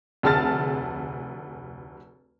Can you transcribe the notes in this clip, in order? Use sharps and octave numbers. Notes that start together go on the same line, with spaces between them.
F1 D2 G#4 A5 F6 A6